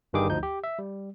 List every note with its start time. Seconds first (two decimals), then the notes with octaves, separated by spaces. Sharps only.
0.13 G1 G2 D#3 G3 G#4 D6
0.29 D2 F3 D#4 G6
0.43 G4
0.64 E5
0.78 G3